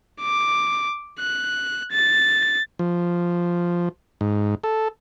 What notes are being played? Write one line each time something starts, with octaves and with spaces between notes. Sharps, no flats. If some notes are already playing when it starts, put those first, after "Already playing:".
D6
F#6
A6
F3
G#2
A4